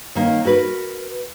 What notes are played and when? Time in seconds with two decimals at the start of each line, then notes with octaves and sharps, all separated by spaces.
0.15 D#3 A#3 C#4
0.45 F#4 A#4 B4